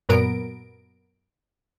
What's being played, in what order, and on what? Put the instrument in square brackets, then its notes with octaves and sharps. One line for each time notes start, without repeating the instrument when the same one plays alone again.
[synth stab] F#2 A#2 F#3 B3 A#4 D7